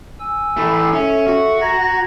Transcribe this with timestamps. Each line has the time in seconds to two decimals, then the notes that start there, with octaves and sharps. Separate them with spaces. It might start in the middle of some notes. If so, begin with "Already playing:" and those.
0.20 G#5 E6
0.57 E3 A3
0.93 C#4 A4 E5
1.27 F#4
1.61 A#5 G#6 A#6